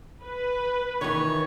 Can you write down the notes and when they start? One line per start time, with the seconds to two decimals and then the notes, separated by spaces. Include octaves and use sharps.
0.22 B4
1.01 D#3 E3 C#5